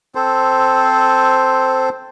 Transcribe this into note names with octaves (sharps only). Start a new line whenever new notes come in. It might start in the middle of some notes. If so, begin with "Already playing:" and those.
C4 A4 C5